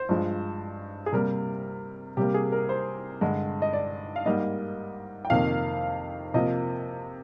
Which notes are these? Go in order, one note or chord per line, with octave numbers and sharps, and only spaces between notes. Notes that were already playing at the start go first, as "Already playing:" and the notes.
Already playing: C5
G2 F3 G#3
G#4
C3 G3 A#3 A#4
C3 G3 A#3 G4
G#4
A#4
C5
G2 D3 G#3
D#5
D5
F5
G#2 G3 A#3 D#5
G5
F2 C3 D#3 A#3 F5
C3 F3 A#3 D#5